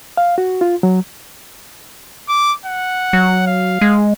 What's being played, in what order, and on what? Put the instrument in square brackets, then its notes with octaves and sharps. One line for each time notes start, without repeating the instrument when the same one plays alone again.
[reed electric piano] F5
F#4
F4
F#3
[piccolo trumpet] D6
F#5
[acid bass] F#3
[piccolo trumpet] F5
[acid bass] G#3